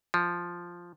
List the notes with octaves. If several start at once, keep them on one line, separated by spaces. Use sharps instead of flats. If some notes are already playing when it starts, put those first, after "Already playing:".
F3